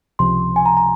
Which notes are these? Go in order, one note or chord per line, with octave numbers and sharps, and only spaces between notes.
C#2 C3 F3 C6
G#5
A#5
A#5